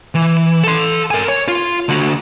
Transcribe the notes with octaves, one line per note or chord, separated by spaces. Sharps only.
E3
A4 C6
A#4 G#5
C#5
F4
D3 F#4